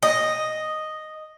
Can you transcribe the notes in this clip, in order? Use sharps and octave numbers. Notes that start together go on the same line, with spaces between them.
D#5